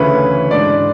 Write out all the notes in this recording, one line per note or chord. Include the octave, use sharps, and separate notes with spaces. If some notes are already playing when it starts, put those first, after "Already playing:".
Already playing: D2 C#3 E3 A3 C#4 B4
G#2 G#3 D4 D5